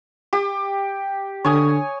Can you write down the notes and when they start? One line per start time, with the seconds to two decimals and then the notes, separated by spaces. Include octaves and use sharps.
0.33 G4
1.44 D3 C#5 G#5 D#6